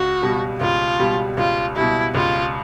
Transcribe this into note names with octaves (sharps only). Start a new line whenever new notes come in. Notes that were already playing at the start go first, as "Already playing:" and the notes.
Already playing: C#2 F#4
B2 G3
C#2 F4
B2 G3
C#2 F4
B2 G3 E4
C#2 F4